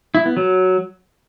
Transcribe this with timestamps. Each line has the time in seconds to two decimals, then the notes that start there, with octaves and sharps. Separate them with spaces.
0.15 E4
0.26 B3
0.37 F#3